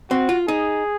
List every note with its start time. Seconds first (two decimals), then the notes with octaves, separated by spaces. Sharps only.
0.11 C4 F#4
0.29 F4
0.48 D#4 G#4